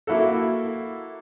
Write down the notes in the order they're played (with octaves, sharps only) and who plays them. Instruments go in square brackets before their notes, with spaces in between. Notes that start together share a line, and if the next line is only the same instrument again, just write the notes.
[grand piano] A#3 E4 F#4 A4